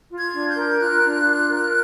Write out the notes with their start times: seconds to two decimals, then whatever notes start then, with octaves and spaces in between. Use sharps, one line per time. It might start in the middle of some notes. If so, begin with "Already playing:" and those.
0.09 F4
0.17 G#6
0.33 D4
0.48 G6
0.56 A#4
0.79 F4 F#6
1.02 D4
1.26 F4
1.48 A#4